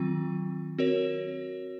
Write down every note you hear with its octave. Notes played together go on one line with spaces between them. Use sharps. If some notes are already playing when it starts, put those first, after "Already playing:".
Already playing: D#3 F#3 C4 F4
C4 F#4 A#4 C#5